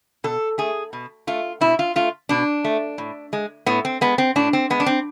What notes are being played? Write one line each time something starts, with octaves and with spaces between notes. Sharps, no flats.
B2 A4
A3 G#4
B2
A3 F4
B2 E4
F4
A3 F4
B2 D4
A3
A2
G#3
A2 B3
C4
G#3 B3
C4
A2 D4
C4
G#3 B3
D4
C4